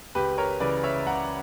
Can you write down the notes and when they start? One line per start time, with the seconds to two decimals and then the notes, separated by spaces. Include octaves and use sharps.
0.15 C#2 G4 B4
0.38 A#4 C#5
0.60 C#3 E3 B4 D5
0.83 C#5 E5
1.07 C#2 F#5 A#5